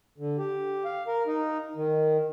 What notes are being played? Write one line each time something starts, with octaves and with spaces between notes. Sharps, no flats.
D3
G4
F5
A#4
D#4
D#3